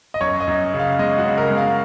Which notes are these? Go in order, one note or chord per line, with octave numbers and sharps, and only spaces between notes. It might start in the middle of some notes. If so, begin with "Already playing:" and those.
D#5
F#2 C#5
D#5
F#2
C#3
F5
G#3 D#5
F#4
C#3
A#4
G#3
F5